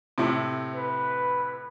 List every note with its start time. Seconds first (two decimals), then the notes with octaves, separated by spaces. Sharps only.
0.18 A2 C3
0.75 B4